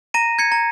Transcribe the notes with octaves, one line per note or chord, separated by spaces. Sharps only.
A#5 A#6 D#7
G#6 C#7
A#5